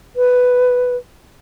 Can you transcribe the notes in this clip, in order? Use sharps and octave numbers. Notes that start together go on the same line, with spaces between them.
B4